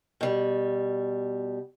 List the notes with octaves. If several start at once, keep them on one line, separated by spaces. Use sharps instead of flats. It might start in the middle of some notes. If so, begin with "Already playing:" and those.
B2 G3